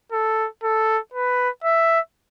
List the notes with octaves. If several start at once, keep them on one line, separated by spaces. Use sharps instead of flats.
A4
A4
B4
E5